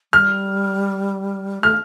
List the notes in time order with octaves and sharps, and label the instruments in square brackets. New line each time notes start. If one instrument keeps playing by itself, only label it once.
[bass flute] G3 [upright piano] F6
[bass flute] A3 [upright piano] F6